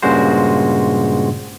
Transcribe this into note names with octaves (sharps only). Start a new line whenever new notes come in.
G2 A#2 C#3 G#3 F#4 C5